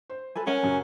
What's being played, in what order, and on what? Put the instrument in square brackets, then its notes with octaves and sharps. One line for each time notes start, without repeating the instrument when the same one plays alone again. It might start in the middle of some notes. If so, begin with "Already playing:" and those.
[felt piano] C5
[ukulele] A4 B4 G#5
[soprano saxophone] C#4 [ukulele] A#4 F#5 G#5
[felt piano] F#2 C#3 F#3